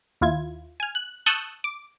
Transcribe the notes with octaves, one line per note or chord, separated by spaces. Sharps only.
D#2 E4 F4 G#6
G#5 F6
F#6
A5 C#6 D#6 E6 F#6 G6
D6